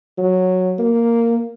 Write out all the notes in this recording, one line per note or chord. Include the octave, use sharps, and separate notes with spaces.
F#3
A#3